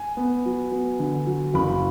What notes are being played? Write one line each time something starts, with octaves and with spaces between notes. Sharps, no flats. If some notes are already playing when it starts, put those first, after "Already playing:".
Already playing: G#5
B3
F#3
B3
D3
F#3
F#1 B5